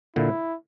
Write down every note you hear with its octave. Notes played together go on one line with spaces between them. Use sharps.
A#2 D3 E4